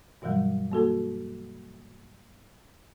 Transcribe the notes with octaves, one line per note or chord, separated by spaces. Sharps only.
G2 B2 E3 F#3 G3
A#3 F#4 A4